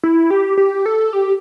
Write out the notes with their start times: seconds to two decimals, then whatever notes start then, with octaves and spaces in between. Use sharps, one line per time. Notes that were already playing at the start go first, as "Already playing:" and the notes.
0.03 E4
0.30 G4
0.57 G4
0.86 A4
1.13 G4